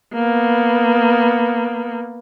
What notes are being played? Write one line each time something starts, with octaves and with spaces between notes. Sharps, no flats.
A#3 B3